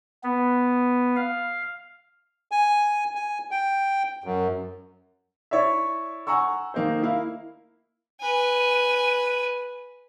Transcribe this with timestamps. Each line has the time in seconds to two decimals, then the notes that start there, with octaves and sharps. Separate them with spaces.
0.23 B3
1.16 F5
2.51 G#5
3.15 G#5
3.51 G5
4.24 F#2
5.51 E4 C#5 D5 E5
6.27 F#5 G#5 A#5 C#6 E6
6.74 D#3 A#3 D#4 C5
7.02 A#3 E4 F5
8.20 B4 G#5